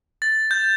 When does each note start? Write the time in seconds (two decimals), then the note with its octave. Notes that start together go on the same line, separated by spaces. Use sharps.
0.22 A6
0.51 G6